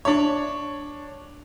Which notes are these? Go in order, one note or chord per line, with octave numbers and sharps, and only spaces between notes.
D4 C#5